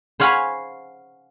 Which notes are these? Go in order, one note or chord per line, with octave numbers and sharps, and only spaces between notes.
C5 C#5 F5 F#5 G#5 B5